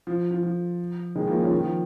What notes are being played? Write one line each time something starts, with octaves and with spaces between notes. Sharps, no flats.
F3
F3
F3
D#3 G#3
F3 A#3
C#4 F4
D#3
F3